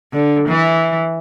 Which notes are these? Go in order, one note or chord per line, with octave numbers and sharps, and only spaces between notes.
D3
E3